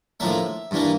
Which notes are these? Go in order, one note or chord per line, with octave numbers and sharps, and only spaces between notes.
A2 F3 A#3 D4 E5
G2 E3 A#3 D4